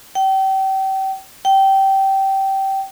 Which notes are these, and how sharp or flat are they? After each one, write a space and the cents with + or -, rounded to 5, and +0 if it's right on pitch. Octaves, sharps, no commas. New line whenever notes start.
G5 -35
G5 -20